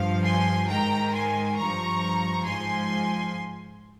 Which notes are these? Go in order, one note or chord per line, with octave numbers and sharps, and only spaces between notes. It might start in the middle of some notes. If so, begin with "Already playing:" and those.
Already playing: G2 F3 F5
G#5 C6
G#2 D#3 G5 A#5
G#5 C6
G2 F3 A#5 C#6
G#2 F3 G#5 C6